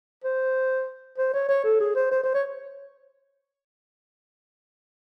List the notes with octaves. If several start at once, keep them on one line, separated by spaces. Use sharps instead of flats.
C5
C5
C#5
C#5
A4
G#4
C5
C5
C5
C#5